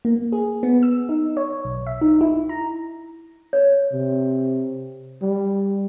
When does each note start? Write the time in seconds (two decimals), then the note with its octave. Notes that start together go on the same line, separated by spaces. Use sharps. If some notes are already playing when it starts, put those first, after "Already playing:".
0.05 A#3
0.32 G#4
0.63 B3
0.83 E6
1.09 D#4
1.37 C#5
1.65 B1
1.87 E5
2.01 D#4
2.21 E4
2.49 A#5
3.53 C#5
3.92 C3
5.22 G3